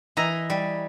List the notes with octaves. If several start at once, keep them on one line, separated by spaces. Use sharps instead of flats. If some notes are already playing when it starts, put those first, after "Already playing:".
E3 D#5 E5 A#5
G3